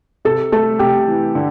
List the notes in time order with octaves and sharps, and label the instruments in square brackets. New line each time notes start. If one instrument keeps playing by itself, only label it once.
[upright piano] C3 [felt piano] A4
[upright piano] A3 [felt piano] A4
[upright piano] C3 [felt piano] G4
[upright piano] E3
D3